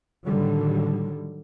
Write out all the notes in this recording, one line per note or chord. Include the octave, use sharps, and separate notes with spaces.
A2 D3 D#3 F#3 G3